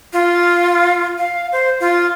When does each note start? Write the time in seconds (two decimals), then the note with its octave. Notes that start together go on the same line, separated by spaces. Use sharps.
0.13 F4
1.18 F5
1.52 C5
1.80 F4